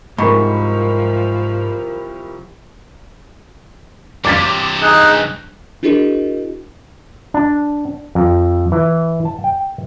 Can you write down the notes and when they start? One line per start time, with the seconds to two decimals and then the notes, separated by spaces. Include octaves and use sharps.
0.18 C2 G#2 F3 A#4 B5 C#6
4.25 G2 C3 D6 A6 B6
4.82 D#4 G#4 F#6
5.83 D4 E4 F#4 G#4 A#4 D#5
7.34 D4
8.15 F2
8.72 E3
9.25 A5
9.44 G5